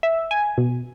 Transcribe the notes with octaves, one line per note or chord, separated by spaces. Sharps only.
E5
G#5
B2